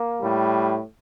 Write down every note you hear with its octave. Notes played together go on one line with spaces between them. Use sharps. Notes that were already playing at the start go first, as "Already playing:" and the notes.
Already playing: A#3
A2 G3